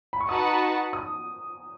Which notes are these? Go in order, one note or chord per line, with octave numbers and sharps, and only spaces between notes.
B5
C#6
D#4 F#4 B4 F#5 A5 D#6
D#6